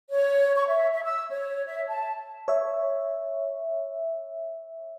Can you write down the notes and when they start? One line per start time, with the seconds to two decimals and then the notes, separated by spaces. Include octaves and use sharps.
0.11 C#5
0.55 C#6
0.67 E5
0.92 E5
1.05 E6
1.30 C#5
1.67 E5
1.89 A5
2.48 C#5 E5